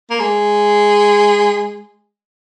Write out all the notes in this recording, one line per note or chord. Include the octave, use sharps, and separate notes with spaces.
A#3
G#3